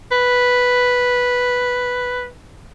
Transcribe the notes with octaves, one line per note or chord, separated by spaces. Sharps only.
B4